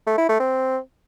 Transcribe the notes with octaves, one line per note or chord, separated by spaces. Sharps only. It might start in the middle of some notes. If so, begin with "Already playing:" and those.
A3
E4
A3
C4